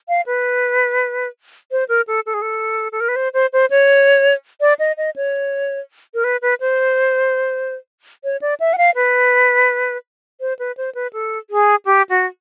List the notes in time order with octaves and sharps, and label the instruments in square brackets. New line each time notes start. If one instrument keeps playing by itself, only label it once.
[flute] F5
B4
C5
A#4
A4
A4
G#4
A4
A4
A#4
B4
C5
C5
C5
C#5
D5
D#5
D#5
C#5
A#4
B4
B4
C5
C#5
D5
E5
F#5
F5
B4
C5
B4
C5
B4
A4
G#4
G4
F#4